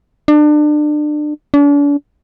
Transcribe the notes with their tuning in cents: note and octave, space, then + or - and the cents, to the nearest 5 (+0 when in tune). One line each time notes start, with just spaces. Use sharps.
D4 +30
D4 -40